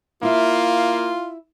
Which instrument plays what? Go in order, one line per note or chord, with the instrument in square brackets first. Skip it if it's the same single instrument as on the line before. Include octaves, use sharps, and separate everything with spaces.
[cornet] A#3 [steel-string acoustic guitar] E4 E5 [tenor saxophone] F4